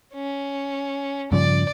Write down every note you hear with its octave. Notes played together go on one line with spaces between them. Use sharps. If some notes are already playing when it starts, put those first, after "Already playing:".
C#4
G2 C#3 F3 D5